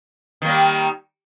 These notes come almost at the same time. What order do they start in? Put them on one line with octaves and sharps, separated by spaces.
D#3 A#3 G3